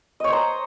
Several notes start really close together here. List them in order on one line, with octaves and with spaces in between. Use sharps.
D#5 C#5 C5 A#5